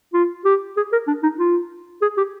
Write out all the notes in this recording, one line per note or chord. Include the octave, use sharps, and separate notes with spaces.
F4
G4
G#4
A#4
D4
D#4
F4
G#4
G4